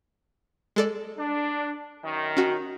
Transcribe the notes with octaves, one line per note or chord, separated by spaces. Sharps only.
G#3 A4 D5
D4
F#2 D#3
C#4 F#4